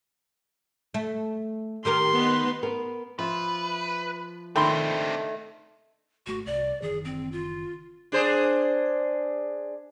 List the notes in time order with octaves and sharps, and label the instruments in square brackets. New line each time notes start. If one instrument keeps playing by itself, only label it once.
[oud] A3
[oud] D#3 G4 A#4 [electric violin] C6
[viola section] B3 D#4 B4
[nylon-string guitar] B3 A#4
[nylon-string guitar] F3 E5 [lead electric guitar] B4
[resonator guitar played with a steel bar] D#3 A3 [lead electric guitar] C4 D4 [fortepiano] G5 B5 C6
[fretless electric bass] G#1 A3 [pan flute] F#4
[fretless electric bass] C2 [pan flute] D5
[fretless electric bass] F#1 D#3 E3 [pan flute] G#4
[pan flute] C4
F4
[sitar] D4 G#4 C5